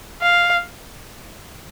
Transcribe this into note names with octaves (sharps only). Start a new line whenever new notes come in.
F5